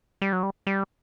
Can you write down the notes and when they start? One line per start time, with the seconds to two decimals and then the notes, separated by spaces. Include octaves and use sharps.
0.22 G3
0.33 F#3
0.43 G3
0.67 G3